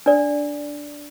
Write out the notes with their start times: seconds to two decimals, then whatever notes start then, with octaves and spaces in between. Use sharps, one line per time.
0.06 D4 D5